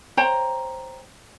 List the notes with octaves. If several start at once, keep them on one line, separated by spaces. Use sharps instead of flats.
C5 C#5 G5 A#5